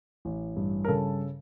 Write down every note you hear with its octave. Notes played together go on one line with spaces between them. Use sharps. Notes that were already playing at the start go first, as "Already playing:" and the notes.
A1
G2
A#4
C#3 A4